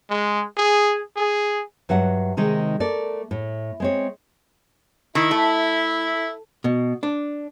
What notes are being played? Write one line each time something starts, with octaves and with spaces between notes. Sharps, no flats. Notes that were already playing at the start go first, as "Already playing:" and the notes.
G#3
G#4
G#4
G2 F#3 E5 F#5
C3 D#3 G#3 D#4
A3 A#4 D5
A2
G#3 C4 C#5
D#3 E4
A3
B2
D4